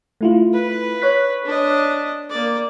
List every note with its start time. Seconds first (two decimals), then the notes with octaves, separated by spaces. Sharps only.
0.21 A3 E4 F4
0.53 B4
1.02 C#5 F#6 B6
1.45 D4 D#5
2.30 A#3 D5